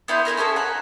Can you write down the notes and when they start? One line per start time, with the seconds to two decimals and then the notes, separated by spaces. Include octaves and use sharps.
0.08 B3 E4 C6 G6
0.25 E4 A#4 D#5 G#5
0.37 C#4 G#4 A4 C5
0.56 F#5 G#5 A#5